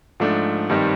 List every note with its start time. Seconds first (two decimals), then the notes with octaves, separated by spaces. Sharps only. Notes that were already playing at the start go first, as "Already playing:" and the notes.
0.20 G#2 F3 A3 D4
0.70 G2 D#3 G3 C4 D#4